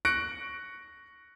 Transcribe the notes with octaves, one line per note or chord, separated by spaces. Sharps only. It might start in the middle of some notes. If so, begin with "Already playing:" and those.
C#6 F#6 A#6 C#7 D7